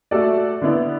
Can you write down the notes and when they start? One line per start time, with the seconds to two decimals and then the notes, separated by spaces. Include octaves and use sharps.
0.11 A3 F#4 A4 D5
0.61 D3 B3 E4 D5